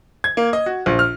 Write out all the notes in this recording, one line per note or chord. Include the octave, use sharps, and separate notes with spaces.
G#6
A#3
D#5
F#4
A#1
F6